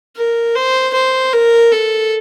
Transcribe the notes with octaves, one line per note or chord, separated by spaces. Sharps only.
A#4
C5
C5
A#4
A4